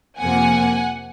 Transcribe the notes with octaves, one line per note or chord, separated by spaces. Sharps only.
F2 C3 F3 A#3 F#5 G#5